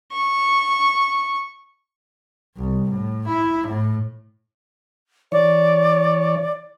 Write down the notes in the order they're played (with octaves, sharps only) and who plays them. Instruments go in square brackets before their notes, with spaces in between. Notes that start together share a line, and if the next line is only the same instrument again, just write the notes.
[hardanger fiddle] C#6
[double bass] C2
A2
E4
A2
[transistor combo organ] E3 C#5 [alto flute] D5